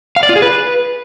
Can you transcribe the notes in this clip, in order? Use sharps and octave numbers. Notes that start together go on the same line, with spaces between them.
F5
D5
F4
G#4
B4